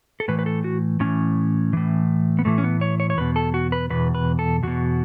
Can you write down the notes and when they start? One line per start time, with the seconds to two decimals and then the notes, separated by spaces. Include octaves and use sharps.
0.20 A4
0.28 A2 E3 B4
0.39 B4
0.46 A4
0.64 F#4
1.00 A2 E3 C#4
1.73 A2 E3
2.39 B3
2.45 A2 E3 A3
2.58 C#4
2.64 B3
2.81 C#5
3.00 C#5
3.10 C#5
3.18 E2 B2 B4
3.36 A4
3.54 F#4
3.72 B4
3.90 E2 B2 B4
4.15 B4
4.39 A4
4.63 E2 B2 F#4